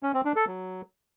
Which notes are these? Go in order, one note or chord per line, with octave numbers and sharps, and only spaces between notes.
C#4
C4
D4
A4
F#3